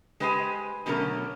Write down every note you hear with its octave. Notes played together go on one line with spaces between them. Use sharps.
G#3 G4 B4 C5 F5 G#5
B2 D3 F#3 A3 C#4 A#4